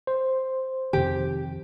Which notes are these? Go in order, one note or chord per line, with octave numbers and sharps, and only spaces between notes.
C5
F2 C3 D#3 G4